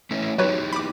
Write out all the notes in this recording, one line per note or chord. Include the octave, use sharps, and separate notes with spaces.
A3 C#4 E4
F#3 D#4 E4 G4 B4 C#5
B5 D6